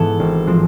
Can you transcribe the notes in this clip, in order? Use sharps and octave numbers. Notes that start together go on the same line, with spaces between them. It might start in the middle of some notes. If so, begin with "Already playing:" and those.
Already playing: G#2 E3 B3 A4
G#1
F3 G#3 C4